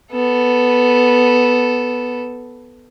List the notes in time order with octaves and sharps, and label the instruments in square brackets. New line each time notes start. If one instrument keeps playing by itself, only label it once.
[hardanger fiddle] B3 A4